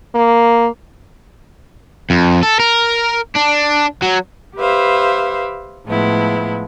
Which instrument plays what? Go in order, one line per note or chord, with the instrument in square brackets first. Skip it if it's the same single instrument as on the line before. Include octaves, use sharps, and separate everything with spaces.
[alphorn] A#3
[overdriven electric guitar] F2
A4
A#4
D4
F#3
[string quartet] G4 B4 C5 E5 F5
A2 F3 G#3 B3 E4